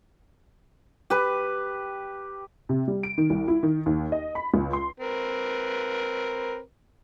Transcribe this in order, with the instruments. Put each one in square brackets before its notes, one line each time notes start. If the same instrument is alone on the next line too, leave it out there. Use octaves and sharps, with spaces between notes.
[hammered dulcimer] G4 B4
[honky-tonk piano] C3
G3
D7
D#3
C2
E4
D#3
D#2
D#5
B5
C#2
C6
[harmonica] C4 A#4 B4